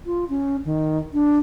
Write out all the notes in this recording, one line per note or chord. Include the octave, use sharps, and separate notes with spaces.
F4
C#4
D#3
D4